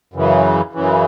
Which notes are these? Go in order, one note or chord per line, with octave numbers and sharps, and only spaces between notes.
F#2 C#3 E3
F#2 C#3 E3